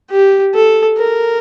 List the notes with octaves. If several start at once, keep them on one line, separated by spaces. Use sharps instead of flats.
G4
A4
A#4